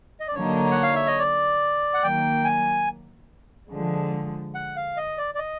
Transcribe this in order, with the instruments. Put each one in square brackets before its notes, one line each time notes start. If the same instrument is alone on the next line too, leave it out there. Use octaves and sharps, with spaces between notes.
[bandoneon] D#5
D5
[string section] D3 F#3 A#3 D#4 [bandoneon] C#5
[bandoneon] F#5
F5
E5
D#5
D5
F#5
[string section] D#3 F#3 A#3 [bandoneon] G5
[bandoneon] G#5
[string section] D3 F3 G#3
[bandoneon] F#5
F5
D#5
D5
D5
D#5